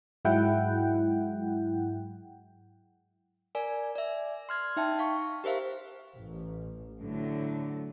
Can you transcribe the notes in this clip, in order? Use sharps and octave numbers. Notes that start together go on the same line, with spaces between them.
G#2 F#3 G#3 E4 F#5 G5
A#4 D5 G#5
D5 E5
C6 F6 G#6
D#4 E5 G5 A5
F5 C#6
G4 A#4 C5 E5 F5
A1
A2 D3 F#3